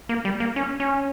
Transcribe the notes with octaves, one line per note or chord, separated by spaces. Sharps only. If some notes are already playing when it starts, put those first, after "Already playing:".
A#3
G3
A#3
C#4
C#4